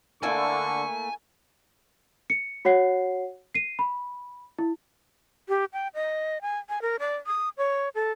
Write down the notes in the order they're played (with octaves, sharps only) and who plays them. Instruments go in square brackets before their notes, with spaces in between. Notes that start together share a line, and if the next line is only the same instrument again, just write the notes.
[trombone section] D3 [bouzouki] A3 A#3 E4 [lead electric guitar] G#5 [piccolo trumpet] C#6
[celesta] C#7
F#4 C#5 F#5 C7
C7 D#7
B5
E4
[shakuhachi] G4
G5
D#5
G#5
G#5
A#4
D5
D#6
C#5
A4